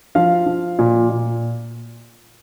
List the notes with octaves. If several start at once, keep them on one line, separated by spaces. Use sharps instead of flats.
F3 F5
F3
A#2
A#2